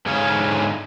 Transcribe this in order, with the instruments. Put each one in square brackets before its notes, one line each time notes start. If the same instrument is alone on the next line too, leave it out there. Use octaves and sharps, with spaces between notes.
[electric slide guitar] G#2 D3 G#4 C#5 F5